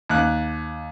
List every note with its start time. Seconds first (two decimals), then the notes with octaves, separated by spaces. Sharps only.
0.10 D#2 F#6